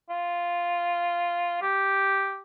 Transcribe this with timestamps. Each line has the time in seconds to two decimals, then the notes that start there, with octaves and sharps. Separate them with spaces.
0.10 F4
1.62 G4